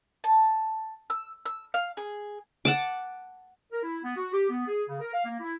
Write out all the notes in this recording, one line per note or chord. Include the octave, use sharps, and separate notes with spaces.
A5
E6
E6
F5
G#4
F#5 A5 D6
A#4
E4
B3
F#4
G4
B3
G#4
C#3
A#4
F5
A#3
E4